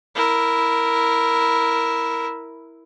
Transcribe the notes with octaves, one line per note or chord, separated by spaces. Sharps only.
E4 A#4